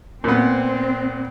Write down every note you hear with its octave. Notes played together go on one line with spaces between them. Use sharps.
A#2 B3 C4